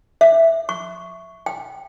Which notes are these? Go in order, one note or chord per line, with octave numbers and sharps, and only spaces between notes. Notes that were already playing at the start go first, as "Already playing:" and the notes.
E5
C#6
G5